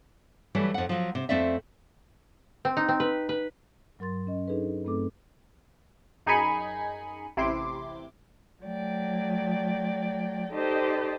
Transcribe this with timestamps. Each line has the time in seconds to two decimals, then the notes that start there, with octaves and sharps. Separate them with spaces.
0.55 E3 F#3 G3 A3
0.74 F2 F#5
0.89 F3 F#3
1.15 C3
1.29 F2 A3 C4 D5 E5
2.65 C4
2.77 D#4
2.89 C4
3.00 B4
3.29 B4
3.99 G2 F#3 A#4 C6 A6
4.27 C#4 D#5
4.48 D4 D#4 G#4 A4 B4
4.85 G2 A3 C4 A4 D6
6.26 F#2 D#4 G#4 G#5 B5 C#7
7.37 A1 C3 E4 C6 D6
8.63 F#3 A3 D5 G5
10.52 D#4 G4 A4 C5 D5 D#5